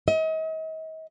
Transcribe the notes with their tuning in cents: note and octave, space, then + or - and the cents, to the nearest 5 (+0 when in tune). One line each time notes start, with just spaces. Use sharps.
D#5 +40